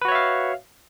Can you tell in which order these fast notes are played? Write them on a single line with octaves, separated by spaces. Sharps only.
B4 F#4 C#5 E5 F5